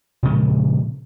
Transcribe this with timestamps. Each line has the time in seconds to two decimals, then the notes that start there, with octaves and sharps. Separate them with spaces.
0.23 A#2 C#3 F3 G#3